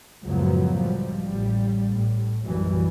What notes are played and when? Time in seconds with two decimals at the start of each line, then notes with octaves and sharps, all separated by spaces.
0.23 C#2 F#2 A2 F3 F#3 B3
0.76 F3 G3
1.24 A1 G3
1.89 A2
2.43 B1 F#2 E3 G3